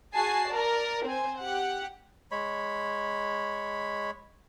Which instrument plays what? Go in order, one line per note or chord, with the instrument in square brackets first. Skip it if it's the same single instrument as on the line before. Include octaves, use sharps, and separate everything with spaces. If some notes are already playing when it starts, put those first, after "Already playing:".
[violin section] F#4 G#4 G#5 A5 C7
A#4 D5
C4 C5 G#5
G4 F#5
[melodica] G#3 C#5 B5